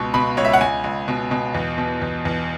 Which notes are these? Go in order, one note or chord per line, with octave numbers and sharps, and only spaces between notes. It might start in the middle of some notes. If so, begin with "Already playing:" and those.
Already playing: C#2 B2 C#6
B2 B5
C#2 C#5
E5
F#5
C#2 G#5
C#2
B2
B2
E2
B2
E2
E2